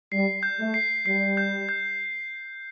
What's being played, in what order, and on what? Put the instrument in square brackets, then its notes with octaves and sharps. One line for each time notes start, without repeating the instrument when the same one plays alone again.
[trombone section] G3 [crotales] C7
[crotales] G6
[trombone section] A3
[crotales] C7
[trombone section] G3 [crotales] C7
[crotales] G6
G6